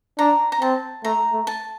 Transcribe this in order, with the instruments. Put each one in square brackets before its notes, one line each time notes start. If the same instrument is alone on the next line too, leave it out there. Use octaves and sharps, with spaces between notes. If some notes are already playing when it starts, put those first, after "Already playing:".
[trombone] D4 [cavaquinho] A#5
[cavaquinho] A#5
[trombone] C4 [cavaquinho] A5
[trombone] A3 [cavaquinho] A#5
[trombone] A3
[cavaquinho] A5